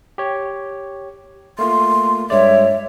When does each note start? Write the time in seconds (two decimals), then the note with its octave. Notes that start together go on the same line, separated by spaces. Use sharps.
0.18 G4 C#5
1.59 A3 A#3 F4 C6
2.30 G2 G#3 C#5 D5 E5